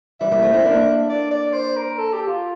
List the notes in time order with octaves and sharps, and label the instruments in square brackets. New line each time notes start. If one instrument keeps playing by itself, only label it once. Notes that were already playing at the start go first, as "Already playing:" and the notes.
[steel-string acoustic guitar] E3 G3 [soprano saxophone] E5
[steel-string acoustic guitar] G3 A#3
A3 C4
C4 E4
A#3 D4
[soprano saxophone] D5
D5
C5
A#4
A4
G4
F4